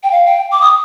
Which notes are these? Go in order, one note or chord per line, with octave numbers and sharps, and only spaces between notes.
G5
F5
G5
D6
D#6